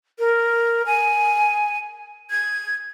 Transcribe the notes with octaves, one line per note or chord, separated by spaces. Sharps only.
A#4
G#5
G#6